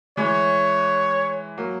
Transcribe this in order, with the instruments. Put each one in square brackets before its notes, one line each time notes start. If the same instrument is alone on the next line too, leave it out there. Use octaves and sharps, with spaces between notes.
[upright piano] E3 G#3 [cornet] C#5
[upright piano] F#3 A#3